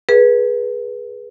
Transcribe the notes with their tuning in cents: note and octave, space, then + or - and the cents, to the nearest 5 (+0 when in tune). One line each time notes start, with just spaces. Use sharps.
G#4 +5 B4 -20